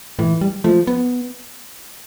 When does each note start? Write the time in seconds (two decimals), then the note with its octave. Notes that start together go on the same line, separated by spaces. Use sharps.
0.19 A2 E3
0.41 G3
0.64 F3 A3
0.87 B3